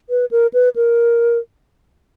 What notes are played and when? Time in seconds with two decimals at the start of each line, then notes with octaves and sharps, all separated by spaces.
0.10 B4
0.31 A#4
0.53 B4
0.76 A#4